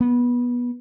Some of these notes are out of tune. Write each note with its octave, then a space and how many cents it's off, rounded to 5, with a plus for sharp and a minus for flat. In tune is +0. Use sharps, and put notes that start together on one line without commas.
B3 -20